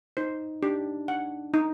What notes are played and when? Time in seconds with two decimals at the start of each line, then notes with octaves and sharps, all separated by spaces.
0.17 D#4 C5
0.63 D4 G4
1.08 F#5
1.54 D#4